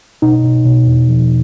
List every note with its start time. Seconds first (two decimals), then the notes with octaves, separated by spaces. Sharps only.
0.22 B2 D#4
0.43 B2
0.66 B2
0.87 E2
1.09 F3